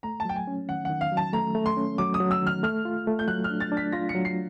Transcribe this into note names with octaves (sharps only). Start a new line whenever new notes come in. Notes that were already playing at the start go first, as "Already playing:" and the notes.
A3 A#5
A5
F#3 G5
G#5
C#4
D#3 F#5
D#3 F#5
F5
F#3
A5
A3 A#5
A3
C6
C#4
F#3 D6
D#6
F#3
E6
D#3 F6
A3 F6
F4
A3
G6
F#3 F#6
F6
D4
A6
D4
B6
F4 A#6
C#7
F#3
C7